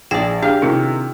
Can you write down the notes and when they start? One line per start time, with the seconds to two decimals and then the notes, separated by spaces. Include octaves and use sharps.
0.11 A#1 G#4 D5 G5
0.43 D4 G4 G#4 F5 F6
0.62 C3 D#3 C#4 E4 F#4